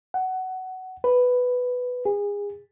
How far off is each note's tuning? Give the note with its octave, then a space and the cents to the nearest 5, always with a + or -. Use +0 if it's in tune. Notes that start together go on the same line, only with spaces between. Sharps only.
F#5 +15
B4 +5
G#4 -30